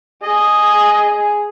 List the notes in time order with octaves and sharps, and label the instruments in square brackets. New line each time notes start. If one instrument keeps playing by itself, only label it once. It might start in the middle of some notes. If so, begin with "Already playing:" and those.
[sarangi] G#4 [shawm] D#5